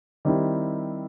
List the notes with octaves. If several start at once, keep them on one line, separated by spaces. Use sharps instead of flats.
D#3 G3 C4 E4